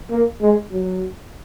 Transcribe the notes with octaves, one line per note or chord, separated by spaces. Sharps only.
A#3
G#3
F#3